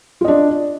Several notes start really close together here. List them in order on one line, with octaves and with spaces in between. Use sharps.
F4 D#5 D4